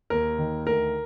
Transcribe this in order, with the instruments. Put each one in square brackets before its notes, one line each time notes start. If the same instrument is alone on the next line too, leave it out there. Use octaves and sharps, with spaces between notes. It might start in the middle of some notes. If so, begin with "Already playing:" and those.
[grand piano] D#2 A#4
D#3
D2 A#4